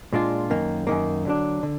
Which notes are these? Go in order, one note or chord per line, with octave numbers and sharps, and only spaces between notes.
A#2 G#3 D4 F4
F#2 D#3 A#3
F#2 D#3 A#3
D3 F#3 D4
D3